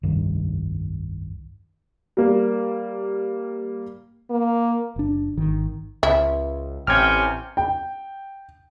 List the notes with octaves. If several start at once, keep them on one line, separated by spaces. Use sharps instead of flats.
F1 C2 G2 D#3
G3 A#3
A#3
F#1 D4
G#1 D#3
C#2 E4
A1 C3 C#4 G5 F6 G#6
G5